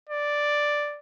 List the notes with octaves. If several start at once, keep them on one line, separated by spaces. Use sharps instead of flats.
D5